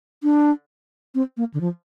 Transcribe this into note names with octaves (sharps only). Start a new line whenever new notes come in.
D4
C4
A#3
D3
F3